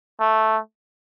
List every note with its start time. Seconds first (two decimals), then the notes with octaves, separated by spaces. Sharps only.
0.20 A3